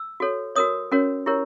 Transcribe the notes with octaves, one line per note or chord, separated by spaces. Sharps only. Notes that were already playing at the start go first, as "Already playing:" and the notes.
Already playing: E6
F#4 A4 C#5
F#4 A#4 C#5 D#6
C#4 F#4 A#4 C#5
E4 G4 A#4 C#5